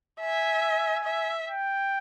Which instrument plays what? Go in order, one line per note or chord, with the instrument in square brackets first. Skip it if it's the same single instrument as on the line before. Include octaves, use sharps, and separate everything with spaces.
[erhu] E5 [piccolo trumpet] G#5
[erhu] E5
[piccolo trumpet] G5